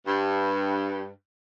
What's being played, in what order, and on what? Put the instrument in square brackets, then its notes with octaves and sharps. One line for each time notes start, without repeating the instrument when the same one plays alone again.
[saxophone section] G2